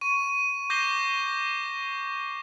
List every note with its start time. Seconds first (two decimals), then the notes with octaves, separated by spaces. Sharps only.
0.01 C#6 D#7
0.70 D6 G6 A#6 C7 E7 G7